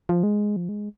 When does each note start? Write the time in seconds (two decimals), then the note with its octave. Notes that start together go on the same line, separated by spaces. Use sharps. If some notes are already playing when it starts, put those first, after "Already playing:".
0.09 F3
0.23 G#3
0.56 F3
0.69 G#3